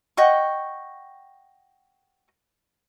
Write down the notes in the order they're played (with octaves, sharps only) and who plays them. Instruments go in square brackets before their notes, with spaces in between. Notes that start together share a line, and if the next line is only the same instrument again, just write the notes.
[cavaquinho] D#5 F#5 G5 C#6